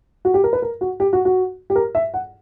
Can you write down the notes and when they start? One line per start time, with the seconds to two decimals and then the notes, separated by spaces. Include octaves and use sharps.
0.25 F#4
0.34 G4
0.44 A#4
0.53 B4
0.62 A#4
0.81 F#4
1.00 G4
1.13 F#4
1.25 F#4
1.70 G4
1.76 A#4
1.95 E5
2.14 F#5